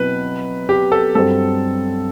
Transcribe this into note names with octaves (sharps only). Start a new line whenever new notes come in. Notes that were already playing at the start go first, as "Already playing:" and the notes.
Already playing: B2 F#3 C4 E4 B4
G4
A4
G2 F#3 C4 G4 A4 C5